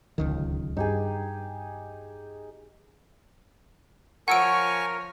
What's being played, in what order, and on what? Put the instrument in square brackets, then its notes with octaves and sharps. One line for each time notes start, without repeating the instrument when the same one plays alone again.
[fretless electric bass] D1 C#2 D#3
[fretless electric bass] G2 [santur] D#4 G4 G#4
[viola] F3 C#5 [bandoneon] A#4 [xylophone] F#5 E6 D7 [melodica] G#5 C#6